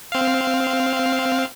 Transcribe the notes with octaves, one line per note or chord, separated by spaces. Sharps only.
C4 F5